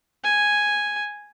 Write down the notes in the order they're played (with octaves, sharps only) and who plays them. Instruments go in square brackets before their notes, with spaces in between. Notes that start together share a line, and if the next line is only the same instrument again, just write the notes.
[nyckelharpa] G#5